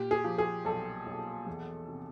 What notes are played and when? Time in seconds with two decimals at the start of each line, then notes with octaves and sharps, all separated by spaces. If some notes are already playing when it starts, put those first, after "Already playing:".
Already playing: A#2 G4
0.11 G#4
0.24 F3
0.38 G#4
0.65 B1 A4
1.06 B1
1.47 E2
1.88 C3